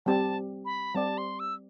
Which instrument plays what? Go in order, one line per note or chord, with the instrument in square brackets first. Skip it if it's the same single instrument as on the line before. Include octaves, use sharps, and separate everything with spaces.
[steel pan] G3 C4 G4 D5 [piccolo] A5
[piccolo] B5
[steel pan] G3 C4 G4 D5 [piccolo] A5
[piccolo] C6
E6